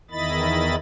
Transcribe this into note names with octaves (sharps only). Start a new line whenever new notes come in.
E2 D#3 E4 D#5 B5 A6